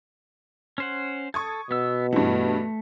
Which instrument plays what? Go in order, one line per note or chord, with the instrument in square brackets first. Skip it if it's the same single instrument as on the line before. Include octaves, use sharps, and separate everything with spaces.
[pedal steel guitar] C#4 C5 F#5
[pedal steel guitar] A4 [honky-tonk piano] C#6 D#6 G#6
[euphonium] B2 [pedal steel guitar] B3 E6
[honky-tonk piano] G2 E3 [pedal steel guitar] A3